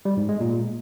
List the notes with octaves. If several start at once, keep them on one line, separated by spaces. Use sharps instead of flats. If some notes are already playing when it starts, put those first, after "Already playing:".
G3
G#2
G#3
A#2